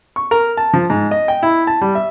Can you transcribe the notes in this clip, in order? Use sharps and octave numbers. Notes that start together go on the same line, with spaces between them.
C#6
A#4
A5
F3
G#2
D#5
G5
E4
A5
G3
E5